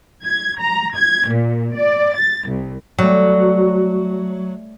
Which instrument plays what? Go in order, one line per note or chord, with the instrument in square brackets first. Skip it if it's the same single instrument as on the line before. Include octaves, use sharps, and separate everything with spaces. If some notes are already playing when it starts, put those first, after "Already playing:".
[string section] G#6
A#5
G#6
A#2
D5
A6
C2
[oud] F#3 [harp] G3 A3